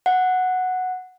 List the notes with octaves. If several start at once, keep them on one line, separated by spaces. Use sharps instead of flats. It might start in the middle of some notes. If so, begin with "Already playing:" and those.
F#5